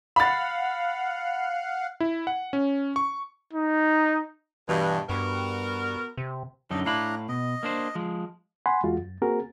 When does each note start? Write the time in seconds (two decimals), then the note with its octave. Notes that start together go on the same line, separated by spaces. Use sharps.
0.16 F5 F#5 B5 A6
2.00 E4
2.27 F#5
2.53 C#4
2.96 C#6
3.53 D#4
4.69 G2 B2 E3
5.09 G2 B3 F#4 A#4
6.17 C3
6.71 F#2 D3 D#4 A4 D#5
6.85 A2 D4 E4 F5 A#5 B5
7.29 B2 D#5
7.63 A#3 D4 C5
7.95 F3 G#3
8.66 F#5 G#5 B5 C6
8.83 E2 G#3 F4 F#4
8.98 F#2
9.22 A#3 C4 F#4 G#4 A#4